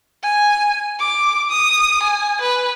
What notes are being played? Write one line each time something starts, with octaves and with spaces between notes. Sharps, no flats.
G#5
D6
D#6
G#5
B4